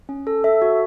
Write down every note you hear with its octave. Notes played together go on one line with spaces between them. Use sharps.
C#4
A4
A4 E5
F#4